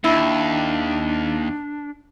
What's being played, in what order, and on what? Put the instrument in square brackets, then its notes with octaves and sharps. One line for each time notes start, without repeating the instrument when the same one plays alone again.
[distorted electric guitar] D#2 [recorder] D4 [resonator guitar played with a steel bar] E4